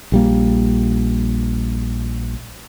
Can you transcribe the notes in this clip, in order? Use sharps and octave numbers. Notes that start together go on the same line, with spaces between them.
A#1 G3 A#3